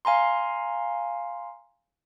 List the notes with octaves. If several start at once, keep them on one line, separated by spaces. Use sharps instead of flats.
F5 G#5 A#5 C6